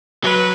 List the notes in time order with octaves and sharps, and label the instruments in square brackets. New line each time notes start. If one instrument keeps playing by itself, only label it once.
[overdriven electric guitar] F#3 [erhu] B4